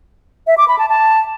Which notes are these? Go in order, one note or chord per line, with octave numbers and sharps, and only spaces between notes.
E5
D6
B5
A5
A5